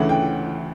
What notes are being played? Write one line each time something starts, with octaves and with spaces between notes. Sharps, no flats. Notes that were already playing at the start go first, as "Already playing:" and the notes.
Already playing: D2 C#3 E3 A3 C#4 F#5
G5